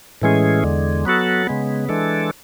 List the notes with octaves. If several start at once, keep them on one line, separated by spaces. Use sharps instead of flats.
A2 E3 G#3 C#4 G#4
E2 D3 G#3
F#3 B3 F#4 A4
C#3 G#3 B3
E3 G#3 D4 A4